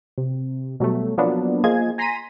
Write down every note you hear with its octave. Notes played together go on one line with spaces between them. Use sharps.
C3
B2 F#3 G3 A3
F3 F#3 A#3 B3 D4
F3 A#3 F4 G#4 D#5 G#6
G#5 A#5 C6 A#6 B6 D#7